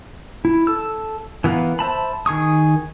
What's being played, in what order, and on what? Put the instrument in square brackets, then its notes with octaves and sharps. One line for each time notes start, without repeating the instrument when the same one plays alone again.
[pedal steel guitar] E4
A4 E6
E3 B3 A#4 B4 F5
C5 E5 A5 B5
D#3 G#4 C#6 D#6